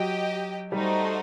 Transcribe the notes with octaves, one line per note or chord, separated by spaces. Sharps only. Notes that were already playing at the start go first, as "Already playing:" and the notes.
Already playing: F#3 G4 D#5 G5
G3 A3 D#4 F#4 C5